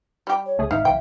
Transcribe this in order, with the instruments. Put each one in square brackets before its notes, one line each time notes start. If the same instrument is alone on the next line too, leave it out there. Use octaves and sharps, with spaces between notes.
[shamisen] G3 G4
[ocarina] C#5
[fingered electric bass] C#2 [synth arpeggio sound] A3 G#4
[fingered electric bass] G#1 G#2 [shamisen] D#4 [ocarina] E5 [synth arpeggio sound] F5
[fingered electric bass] B1 E3 [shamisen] G5